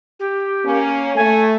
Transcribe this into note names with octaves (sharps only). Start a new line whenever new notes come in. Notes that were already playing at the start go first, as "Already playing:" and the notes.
G4
A#3 C#4
A3 G#5